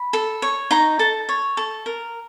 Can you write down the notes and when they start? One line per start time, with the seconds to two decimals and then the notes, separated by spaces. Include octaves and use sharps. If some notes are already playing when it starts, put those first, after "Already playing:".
Already playing: B5
0.13 A4
0.42 C#5
0.71 D#4 A#5
0.99 A4 A5
1.29 C#5
1.57 A4
1.86 A#4